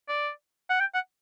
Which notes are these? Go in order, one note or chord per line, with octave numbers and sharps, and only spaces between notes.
D5
F#5
G5
F#5